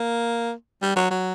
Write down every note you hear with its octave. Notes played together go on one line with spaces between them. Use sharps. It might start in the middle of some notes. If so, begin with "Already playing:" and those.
Already playing: A#3
G3
F#3
F#3